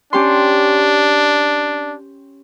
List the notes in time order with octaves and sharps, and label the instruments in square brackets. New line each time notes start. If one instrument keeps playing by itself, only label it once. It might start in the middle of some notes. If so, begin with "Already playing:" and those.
[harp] C#4 G4 C6 [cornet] D4